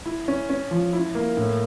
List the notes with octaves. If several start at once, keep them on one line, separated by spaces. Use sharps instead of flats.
E4
C#4
C#4
F3
E4
A#3
A2